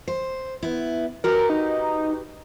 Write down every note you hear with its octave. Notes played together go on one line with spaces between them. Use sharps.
C5
B3 E4
F#4 G4 A#4 B4
D#4